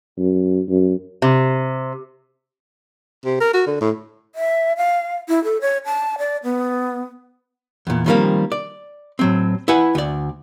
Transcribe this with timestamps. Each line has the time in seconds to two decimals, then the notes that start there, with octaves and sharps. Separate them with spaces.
0.18 F#2
0.69 F#2
1.22 C3
3.25 C3
3.40 A#4
3.54 F#4
3.67 D3
3.81 A2
4.35 E5
4.77 F5
5.29 E4
5.44 A4
5.61 C#5
5.85 A5
6.18 D5
6.44 B3
7.87 E2 A#2
8.06 D#3 F3 G3 A3 A#3 C4
8.52 D5
9.19 A2 F#3 C4
9.68 E4 B4 F#5 G#5
9.95 D2 D5